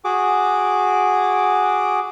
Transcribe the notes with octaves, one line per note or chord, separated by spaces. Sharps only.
F#4 G#4 D6